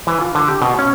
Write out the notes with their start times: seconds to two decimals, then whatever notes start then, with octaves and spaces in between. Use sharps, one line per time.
0.07 E3
0.21 F4
0.35 D3
0.48 G4
0.62 B2
0.79 C#4